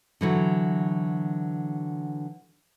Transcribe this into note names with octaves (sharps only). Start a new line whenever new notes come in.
D3 E3 F#3